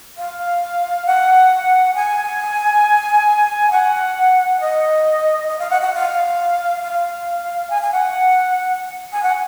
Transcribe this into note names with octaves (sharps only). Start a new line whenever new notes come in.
F5
F#5
G#5
F#5
D#5
D#5
F5
F#5
F#5
F5
F5
G#5
G#5
F#5
G#5
F#5